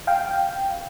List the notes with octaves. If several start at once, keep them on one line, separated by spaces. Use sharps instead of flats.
F5 G5